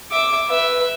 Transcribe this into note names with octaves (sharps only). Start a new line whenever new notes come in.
E5 D6
B4 E5